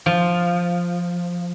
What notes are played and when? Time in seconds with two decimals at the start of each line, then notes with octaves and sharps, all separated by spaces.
0.06 F3